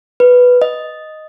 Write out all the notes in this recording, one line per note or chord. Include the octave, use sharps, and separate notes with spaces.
B4
D#5